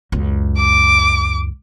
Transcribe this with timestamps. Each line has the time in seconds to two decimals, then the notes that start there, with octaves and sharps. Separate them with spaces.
0.12 C#2 F#2
0.57 D6